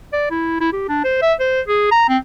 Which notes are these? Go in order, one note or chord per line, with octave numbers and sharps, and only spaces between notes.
D5
E4
E4
G4
D4
C5
E5
C5
G#4
A#5
C4